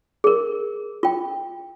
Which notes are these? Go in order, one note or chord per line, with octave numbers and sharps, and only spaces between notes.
G#4 A#4
F4 G5